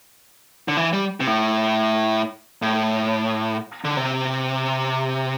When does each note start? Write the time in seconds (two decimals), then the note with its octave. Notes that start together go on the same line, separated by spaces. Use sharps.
0.68 D3
0.77 E3
0.93 G3
1.20 C3
1.27 A2
2.62 A2
3.85 D3
3.97 C3